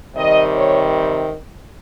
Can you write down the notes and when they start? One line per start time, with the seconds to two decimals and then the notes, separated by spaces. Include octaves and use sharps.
0.16 C3 D#3 G3 D#5
0.52 C#5